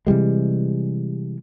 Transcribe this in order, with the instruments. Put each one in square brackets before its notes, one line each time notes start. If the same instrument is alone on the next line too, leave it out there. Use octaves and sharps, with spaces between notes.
[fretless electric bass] C3 E3 G3 G#3